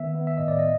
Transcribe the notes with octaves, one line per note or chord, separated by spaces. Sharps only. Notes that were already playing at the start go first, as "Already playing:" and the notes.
Already playing: D#3 B3 E5
B3
E5
A2 D#5
D5
D#5